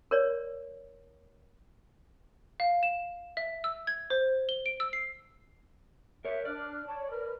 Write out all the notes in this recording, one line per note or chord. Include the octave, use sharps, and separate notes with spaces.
A#4 C#5 D5
F5
E7
E5
E6
G#6
C5
G7
D7
E6
C7
A#4 C#5 E5
D4 D5 F6 F#6
C#5 A5
A#4 B4 F6